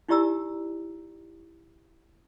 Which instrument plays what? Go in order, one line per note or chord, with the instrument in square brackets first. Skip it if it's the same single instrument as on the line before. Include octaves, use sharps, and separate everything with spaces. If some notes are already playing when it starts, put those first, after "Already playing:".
[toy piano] D#4 E4 G4 D5 A#5 E6